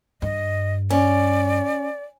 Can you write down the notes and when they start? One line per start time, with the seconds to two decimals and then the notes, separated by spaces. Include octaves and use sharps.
0.22 G2 D#5
0.90 C#4 D5